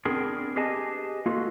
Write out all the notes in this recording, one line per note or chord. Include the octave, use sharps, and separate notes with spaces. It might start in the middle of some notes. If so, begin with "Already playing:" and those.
B3 C4 D4 G#4 A#4
G4 G#4 B4 D#5 G#5 A5
A#3 F4 F#4 A4 B4